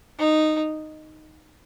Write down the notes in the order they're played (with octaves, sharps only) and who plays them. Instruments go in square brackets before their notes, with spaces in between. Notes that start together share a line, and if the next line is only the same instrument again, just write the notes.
[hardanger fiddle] D#4